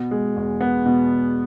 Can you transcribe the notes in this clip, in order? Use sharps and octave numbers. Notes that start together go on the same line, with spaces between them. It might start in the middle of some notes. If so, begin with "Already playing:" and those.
Already playing: B2
G#3
E2
B3
B2